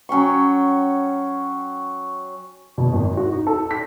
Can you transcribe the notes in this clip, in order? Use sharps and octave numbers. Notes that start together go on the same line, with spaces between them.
F#3 C#4 G5 C#6
B2
G#1
F#4
D#4
A4
B6